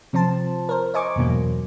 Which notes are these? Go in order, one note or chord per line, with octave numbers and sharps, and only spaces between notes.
C3 F3 C4 C5 A5
A#4 C5
C5 D#5 G#5 C#6 D6
E2 G2 B2 F#3 A#3